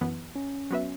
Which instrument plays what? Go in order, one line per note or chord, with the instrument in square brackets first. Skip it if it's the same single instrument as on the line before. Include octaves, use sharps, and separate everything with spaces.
[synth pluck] F#2 E3 B3
[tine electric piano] C#4
[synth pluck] F#3 B3 F#4 B4 E5